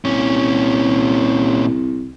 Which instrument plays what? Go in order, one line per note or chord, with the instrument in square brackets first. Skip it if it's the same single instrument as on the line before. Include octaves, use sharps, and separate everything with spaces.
[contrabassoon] C2 [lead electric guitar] A#2 C#4